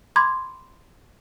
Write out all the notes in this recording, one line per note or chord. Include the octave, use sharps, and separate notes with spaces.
B5 C6 D6 G#6